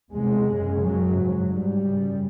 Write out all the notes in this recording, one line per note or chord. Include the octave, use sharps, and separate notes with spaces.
E2 C3 G#3
F#2 C#3
F#2 C#3 F#3
G#2
G#2 G3
F#2 C#3